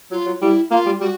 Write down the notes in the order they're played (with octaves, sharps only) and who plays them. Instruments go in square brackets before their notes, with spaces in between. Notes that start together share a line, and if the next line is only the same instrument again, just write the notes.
[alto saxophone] F#3 [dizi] F4
[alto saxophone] F#3
[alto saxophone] G3 [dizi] E4
[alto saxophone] A#3 [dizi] F4
[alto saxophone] G3
[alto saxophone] G3 [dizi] F#4